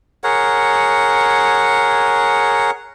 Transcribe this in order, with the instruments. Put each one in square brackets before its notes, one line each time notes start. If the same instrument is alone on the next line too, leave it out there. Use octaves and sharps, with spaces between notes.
[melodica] G#4 A#4 C#5 F#5